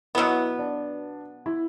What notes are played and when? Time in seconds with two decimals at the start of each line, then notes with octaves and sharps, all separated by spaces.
0.15 B2 F#3 B3 E4
0.59 D4
1.46 E4